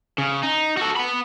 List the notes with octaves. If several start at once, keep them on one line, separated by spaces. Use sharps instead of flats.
C#3
D#4
F#4 A4
F#5 B5